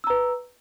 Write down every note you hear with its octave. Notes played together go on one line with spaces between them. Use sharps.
B4 A#5 E6